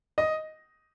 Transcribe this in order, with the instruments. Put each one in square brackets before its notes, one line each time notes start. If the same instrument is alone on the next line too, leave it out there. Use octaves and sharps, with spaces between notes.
[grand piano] D#5